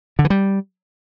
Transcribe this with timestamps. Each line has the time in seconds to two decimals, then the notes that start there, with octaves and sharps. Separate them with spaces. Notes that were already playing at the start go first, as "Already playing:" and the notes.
0.19 D3
0.25 E3
0.30 G3